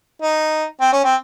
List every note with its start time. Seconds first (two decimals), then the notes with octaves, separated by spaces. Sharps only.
0.22 D#4
0.81 C4
0.93 C#4
1.05 C4